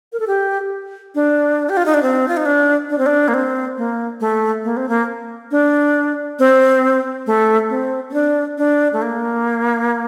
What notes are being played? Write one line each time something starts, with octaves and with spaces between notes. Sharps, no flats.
A#4
A4
G4
D4
G4
F4
D#4
D4
C4
F4
D#4
D4
D4
C4
D4
A#3
C4
A#3
A3
A#3
C4
A#3
D4
C4
A3
C4
C4
D4
D4
A3
A#3